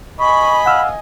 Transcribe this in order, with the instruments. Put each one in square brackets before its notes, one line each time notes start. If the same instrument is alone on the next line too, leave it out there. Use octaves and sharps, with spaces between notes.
[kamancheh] D#5 G#5 [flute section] B5 [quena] C#6
[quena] F5 [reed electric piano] F#5 E6 F6